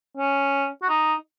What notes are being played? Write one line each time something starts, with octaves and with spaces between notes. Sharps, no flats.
C#4
F#4
D#4